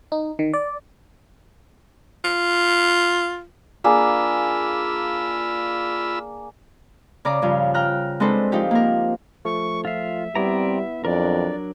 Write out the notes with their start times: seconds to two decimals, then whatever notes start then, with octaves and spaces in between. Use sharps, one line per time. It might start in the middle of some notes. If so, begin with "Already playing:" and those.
0.12 D#4
0.39 D#3
0.53 D5
2.25 F4
3.84 A#3 D4 F4 G#4 B5 E6
7.25 C#3 D5 A#5 D6
7.42 G2 C#3 F3
7.74 G5 A#5 F6 F#6
8.20 G#3 C4 D4 A4 B4 C5
8.52 F3 D#4 G4
8.71 A#3 A#4
9.45 F3 A3 C#6
9.85 F4 E5 F5
10.35 G3 B3 C4 E4 D5 A#5
11.05 F2 F#3 D4 A#4 D5